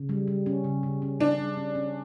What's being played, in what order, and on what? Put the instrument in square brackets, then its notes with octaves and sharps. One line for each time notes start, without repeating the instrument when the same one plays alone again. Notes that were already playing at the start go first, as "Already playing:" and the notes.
Already playing: [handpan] C#3
G3
G3
C#4
C#3
C#3
C#4
[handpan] C#3 [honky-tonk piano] D4
[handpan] G3
C#4
C#4